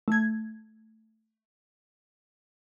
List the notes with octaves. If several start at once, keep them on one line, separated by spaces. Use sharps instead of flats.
A3 G#6